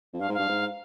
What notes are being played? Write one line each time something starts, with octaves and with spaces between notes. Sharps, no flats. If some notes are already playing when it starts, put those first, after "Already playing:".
F2
G2 F5
G#2
G2 F5
G#2